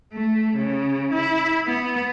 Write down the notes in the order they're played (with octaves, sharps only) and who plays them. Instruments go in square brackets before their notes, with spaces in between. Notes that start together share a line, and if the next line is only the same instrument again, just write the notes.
[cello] A3
C#3
E4
B3